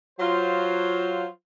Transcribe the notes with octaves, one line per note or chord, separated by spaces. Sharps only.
F#3 F4 C5